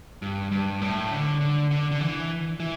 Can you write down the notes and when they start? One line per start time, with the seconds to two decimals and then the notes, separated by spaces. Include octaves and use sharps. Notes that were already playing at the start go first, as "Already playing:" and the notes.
0.22 G2
0.52 G2
0.82 A2
1.11 D3
1.41 D3
1.71 D3
1.91 D3
2.01 E3
2.60 E3